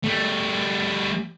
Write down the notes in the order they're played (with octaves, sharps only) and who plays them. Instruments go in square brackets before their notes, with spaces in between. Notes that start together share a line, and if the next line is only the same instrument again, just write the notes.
[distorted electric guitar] G3 A3